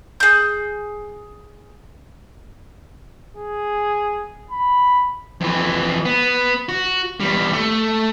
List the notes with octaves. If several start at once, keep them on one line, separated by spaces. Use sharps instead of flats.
G#4 G6
G#4
B5
F2 E3
B3
F#4
E2 G3
A3